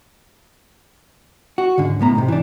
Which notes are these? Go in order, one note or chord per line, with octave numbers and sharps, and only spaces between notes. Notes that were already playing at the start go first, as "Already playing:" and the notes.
F#4
C#2 G#2 D3
B1 A2 B3 A#5
B1 G#2 C3
E3 D4